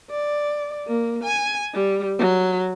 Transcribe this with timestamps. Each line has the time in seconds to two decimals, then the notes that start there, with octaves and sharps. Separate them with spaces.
0.10 D5
0.87 A#3
1.24 G#5
1.74 G3
2.19 F#3